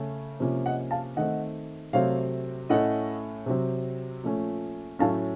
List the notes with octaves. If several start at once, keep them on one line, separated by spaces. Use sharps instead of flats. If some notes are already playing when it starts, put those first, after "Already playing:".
Already playing: C#3 A3 C#4
C3 F3 A#3 C#4
D#5 F#5
F5 A5
D#3 A3 C4 D#5 F#5
C3 F#3 A3 C4 C#5 F5
A2 A3 C#4 D#5 F#5
C3 F#3 C4
A#2 F3 A3 C#4
A2 F#3 A3 C#4 F5 A5